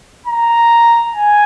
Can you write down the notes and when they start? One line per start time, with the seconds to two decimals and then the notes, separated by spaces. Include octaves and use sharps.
0.26 A#5
1.13 G#5